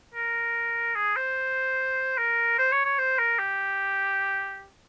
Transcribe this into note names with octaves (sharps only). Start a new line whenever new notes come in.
A#4
G#4
C5
A#4
C5
C#5
C#5
C5
A#4
G4